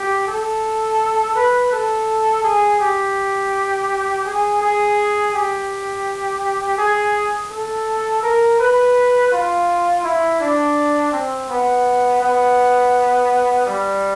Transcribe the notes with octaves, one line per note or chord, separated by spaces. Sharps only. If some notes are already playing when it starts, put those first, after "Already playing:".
Already playing: G4
A4
B4
A4
G#4
G4
G#4
G#4
G4
G#4
A4
A#4
B4
F4
E4
D4
C4
B3
B3
G3